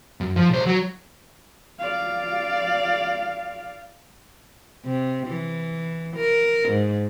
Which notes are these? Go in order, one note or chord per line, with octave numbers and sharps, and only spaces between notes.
F#2
F3
B1 C5
F#3
D5 F5
C3
E3
A#4
G#2